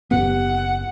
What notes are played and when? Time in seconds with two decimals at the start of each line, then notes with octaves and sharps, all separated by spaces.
0.11 F#1 F#2 B3 G4 F#5